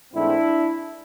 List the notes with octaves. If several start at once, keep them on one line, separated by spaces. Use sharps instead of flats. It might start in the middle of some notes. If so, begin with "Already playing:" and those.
G#2 E3 A3 C4 D4 E4